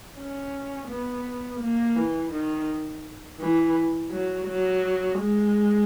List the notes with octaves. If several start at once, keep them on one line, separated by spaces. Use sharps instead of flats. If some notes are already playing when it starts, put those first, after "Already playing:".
C#4
B3
A#3
E3
D#3
E3
F#3
F#3
G#3